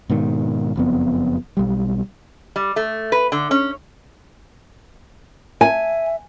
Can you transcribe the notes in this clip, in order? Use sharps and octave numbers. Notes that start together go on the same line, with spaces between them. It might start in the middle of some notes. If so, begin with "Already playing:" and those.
G#2 B2 D#3
F#1 F2 B3
B1 G3
G3
A3
B4
D3
C#4
E5 G#5